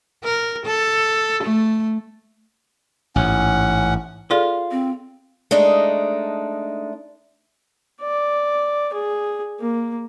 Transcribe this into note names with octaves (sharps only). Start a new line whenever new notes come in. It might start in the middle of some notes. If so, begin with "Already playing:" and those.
A#4
A4
A3
A1 G#2 C#4 F#5
F4 G#4 A4 D5
C4
G#3 A3 D4 D#4
D5
G#4
A#3